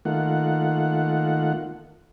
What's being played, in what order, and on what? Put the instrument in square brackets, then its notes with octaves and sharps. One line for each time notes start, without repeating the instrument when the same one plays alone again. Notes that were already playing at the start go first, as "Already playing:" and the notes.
[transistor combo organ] D#3 A3 A#3 F4 F#5